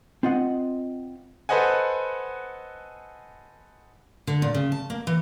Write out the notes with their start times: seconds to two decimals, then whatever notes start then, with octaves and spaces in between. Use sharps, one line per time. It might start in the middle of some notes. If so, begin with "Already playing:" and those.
0.23 C4 F4 D#5 F#5
1.49 A4 B4 C5 D#5 F#5 G#5
4.27 D3
4.42 A#2
4.55 C#3
4.72 A5
4.90 A#3
5.07 E3